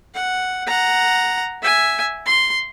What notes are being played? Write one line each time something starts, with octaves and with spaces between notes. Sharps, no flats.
F#5
F#5 A#5
E5 G#5
C6